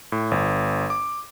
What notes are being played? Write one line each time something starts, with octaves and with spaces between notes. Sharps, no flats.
A2
G1
D6